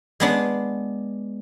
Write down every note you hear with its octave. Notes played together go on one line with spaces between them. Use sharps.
G#3 B3 D4